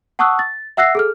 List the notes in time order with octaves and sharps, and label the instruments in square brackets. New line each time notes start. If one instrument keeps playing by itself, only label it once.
[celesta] F#5 A5 C#6 D#6 E6 F#6
A6
E5 F#5 E6 F#6 A#6 C7
G#4 A4 F6